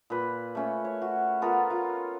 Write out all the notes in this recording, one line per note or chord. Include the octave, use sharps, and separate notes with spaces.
A#2 B4
A3 C#4
C#5
F#4
B3 F4 A4 A#4
F4